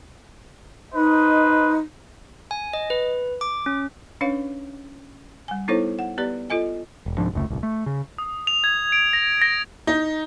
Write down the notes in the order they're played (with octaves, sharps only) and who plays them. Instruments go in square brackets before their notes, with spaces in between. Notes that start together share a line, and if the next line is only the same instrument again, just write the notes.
[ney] D#4 [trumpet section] B4 C5 D#5
[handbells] G#5
D#5
B4
D6
C#4
[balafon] C#4 D4 B4 C#5 F5
G3 G#5
B3 D#4 E4 A4 C5 C#5
F#5
B3 G4 B4 D5
F4 A4 D#5 G#5
[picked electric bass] E1
C2 G#2 F3 D4
F1 C#2 A3
D1 C2
A3
C#3
[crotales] D#6
F7
G#6
D7
A#6
A#6
[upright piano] D#4